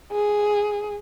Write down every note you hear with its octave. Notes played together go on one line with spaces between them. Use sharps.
G#4